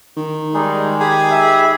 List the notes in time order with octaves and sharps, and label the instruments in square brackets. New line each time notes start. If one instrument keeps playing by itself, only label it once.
[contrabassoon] D#3
[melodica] G3 D#4 G#4 [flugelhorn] G#3
[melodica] G4 G#5 B5 [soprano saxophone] G#4
[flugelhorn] E5